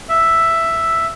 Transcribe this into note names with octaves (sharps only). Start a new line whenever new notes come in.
E5